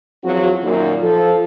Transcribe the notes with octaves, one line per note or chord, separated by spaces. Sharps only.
E2 F3 F#3 C4 F#4
F#2 A#2 D#3
F3 A4